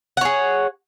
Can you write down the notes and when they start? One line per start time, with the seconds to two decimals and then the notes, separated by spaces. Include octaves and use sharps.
0.17 F#5
0.21 C#5
0.25 G#4